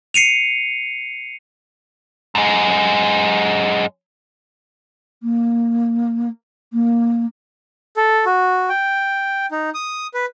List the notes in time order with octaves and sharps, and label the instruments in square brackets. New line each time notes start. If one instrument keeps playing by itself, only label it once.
[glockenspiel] C7 C#7 D#7 F7
[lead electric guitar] F#2 G#3
[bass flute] A#3
A#3
[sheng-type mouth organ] A4
F#4
G5
D#4
D#6
B4